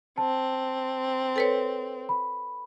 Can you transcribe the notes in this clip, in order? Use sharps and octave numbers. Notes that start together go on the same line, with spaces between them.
C4 A5
A4 B4 C#5
B5